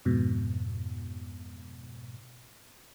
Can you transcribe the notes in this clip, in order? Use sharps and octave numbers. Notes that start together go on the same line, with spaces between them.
F2 G#2 B2